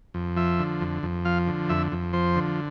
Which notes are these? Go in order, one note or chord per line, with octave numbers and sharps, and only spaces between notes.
F2
F3 E5
D3
F2
F2
F3 F5
D3
F2 E5
F2
F3 C5
D3